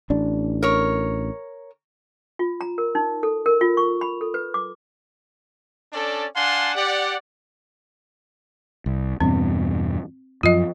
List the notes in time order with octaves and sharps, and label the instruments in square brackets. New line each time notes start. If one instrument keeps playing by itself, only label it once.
[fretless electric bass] A1 D4
[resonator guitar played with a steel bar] A#4 C#5
[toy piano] F4
A#5
A#4
D#4
A4
A#4
F4
C#6
B5
A4
B4
D6
[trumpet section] C#4 D4 A4 D5
D4 F5 F#5 G#5 A5 C6
G4 D5 F#5
[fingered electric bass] C2
[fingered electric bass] E2 G2 B2 [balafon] C4
[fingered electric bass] F#2 F3 [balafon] F4 D#5